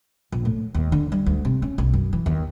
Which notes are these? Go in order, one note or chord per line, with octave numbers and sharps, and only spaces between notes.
A#1
A2
D#2
D3
G3
D2
C3
C#4
B1
F#2
E3
D#2